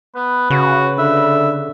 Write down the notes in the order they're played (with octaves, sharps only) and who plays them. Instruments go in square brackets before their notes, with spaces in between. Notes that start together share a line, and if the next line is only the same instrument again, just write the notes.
[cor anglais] B3 [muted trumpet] B4
[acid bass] C#3 [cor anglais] F#4
[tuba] D3 [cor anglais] E5